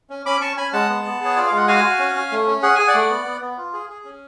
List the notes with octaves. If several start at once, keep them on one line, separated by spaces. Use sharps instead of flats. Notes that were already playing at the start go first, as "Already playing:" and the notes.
C#4
C#4 B5 D6
C#4 A5 C#6
C#4 G#5 B5
G#3 F#5 A5
B3
B3
G#4 C#5
F4 D5
G#3 F5
F#5
F#4 F5 G#5
F#4
C#4
C#4
A3
C#4
G#4 F#5
G#4 G#5
D5 F#5
A3
B3
B3
B3
F4
G#4
G#4
C#4